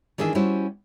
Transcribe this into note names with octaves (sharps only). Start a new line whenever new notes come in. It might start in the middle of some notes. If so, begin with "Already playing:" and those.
D#3 E3 D4 G#4 B4 E5
G3 C#4 E4 F#4 C5